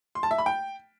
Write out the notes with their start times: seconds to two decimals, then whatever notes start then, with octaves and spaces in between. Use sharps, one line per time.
0.15 C6
0.23 A5
0.31 E5
0.38 B5
0.46 G5